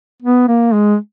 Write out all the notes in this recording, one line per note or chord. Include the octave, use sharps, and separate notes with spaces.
B3
A#3
G#3